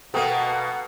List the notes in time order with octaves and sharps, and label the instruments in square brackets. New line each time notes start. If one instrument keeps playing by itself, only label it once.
[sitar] B2 A#3 [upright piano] A4 G5 D#6 [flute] F#5